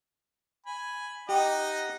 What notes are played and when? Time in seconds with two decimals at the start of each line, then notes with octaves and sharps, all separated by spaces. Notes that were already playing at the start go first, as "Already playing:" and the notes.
0.66 G#5 B5
1.29 D#4 G4 D#5 F#5